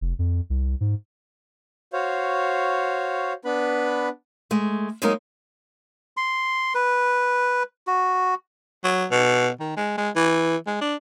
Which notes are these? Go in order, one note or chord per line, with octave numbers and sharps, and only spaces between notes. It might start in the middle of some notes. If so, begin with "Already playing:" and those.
F1
F2
C2
G#2
F#4 C5 C#5 F5
B3 D4 B4 B5
G#3 A3
F#3 G#3 A#3 C#4 D#4 A#4
C6
B4
F#4
F#3
B2
D#3
G#3
G#3
E3
G#3
D4